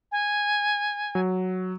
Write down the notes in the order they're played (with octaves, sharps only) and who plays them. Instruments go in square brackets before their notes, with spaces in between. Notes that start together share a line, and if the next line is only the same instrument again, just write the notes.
[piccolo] G#5
[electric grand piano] F#3